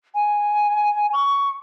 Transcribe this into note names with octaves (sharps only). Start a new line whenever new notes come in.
G#5
C#6